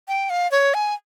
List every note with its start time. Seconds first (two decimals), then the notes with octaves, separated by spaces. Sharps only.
0.08 G5
0.30 F5
0.51 C#5
0.74 G#5